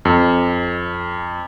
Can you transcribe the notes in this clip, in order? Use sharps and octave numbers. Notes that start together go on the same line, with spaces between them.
F2